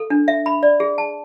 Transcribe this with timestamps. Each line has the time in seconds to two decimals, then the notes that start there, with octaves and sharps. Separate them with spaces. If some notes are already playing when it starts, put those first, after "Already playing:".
Already playing: A4
0.10 D4
0.28 E5
0.46 B5
0.63 D5
0.80 G#4
0.98 A5